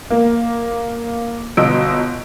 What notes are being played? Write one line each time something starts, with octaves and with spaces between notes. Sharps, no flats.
A#3
G1 B2 D#5 E6 D7